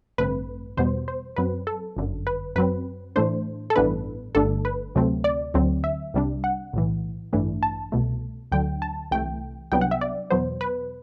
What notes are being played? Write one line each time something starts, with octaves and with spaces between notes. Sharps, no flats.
A1 G2 D3 A3 C4 B4
E2 B2 G3 B3 C5
C5
F#2 F#3 C4 B4
A4
G1 F#2 D3
B4
F#2 F#3 C4 B4
A2 E3 A3 D4 C5
A4
A1 G2 E3 B3 D4 B4
G1 G2 D3 A3 D4 A4
B4
D2 C3 F#3 A3 C4
D5
D2 D3 F#3 C4
E5
C2 C3 G3 D4
F#5
B1 A2 E3
A1 G2 E3 A3 D4
A5
C2 B2 A3
D2 D3 F#3 G5
A5
C2 C3 E3 A3 G5
C2 C3 F#3 B3 D4 G5
F#5
E5
D5
E2 B2 F#3 B3 C5
B4